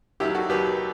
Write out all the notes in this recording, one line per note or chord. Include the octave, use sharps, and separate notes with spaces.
D#2 D#3 F#3 E4 G4
F#4 A4
D#2 D#3 F#3 G4 B4